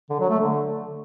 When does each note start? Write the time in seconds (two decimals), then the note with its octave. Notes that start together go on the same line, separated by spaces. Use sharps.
0.10 D3
0.20 F#3
0.30 A3
0.40 D3